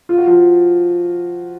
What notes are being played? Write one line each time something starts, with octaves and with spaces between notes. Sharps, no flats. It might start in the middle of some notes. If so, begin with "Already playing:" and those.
F4
F#4
F3 F4